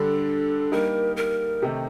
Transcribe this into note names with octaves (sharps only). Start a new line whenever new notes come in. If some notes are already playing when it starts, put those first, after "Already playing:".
Already playing: D3 G3 D4 A4
G3 A#3 D#4 G4 A#4
A#4
C3 D#3 A3 D#4 G4